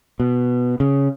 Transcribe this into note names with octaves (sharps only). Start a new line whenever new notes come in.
B2
C#3